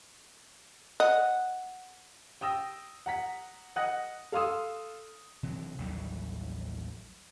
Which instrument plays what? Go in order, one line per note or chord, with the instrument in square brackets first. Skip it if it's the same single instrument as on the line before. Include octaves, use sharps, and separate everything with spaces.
[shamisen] D#5 [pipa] F#5
[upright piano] G5 D#6 E6 A#6
F#5 A#5 B6
D#5 F#5 D#6 F#6 A#6
A4 F5 C6 D#6 E6
[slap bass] C3 E3 F#3
A1 D#2 F#3 G3